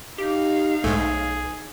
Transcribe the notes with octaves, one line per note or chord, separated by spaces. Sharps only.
D#4 G4 F5
B1 G#2 A3 G#4